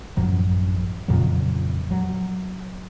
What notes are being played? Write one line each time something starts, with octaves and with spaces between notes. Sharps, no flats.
A1 F#2 F3 F#3
F2 A#2 C#3 F#3
F#3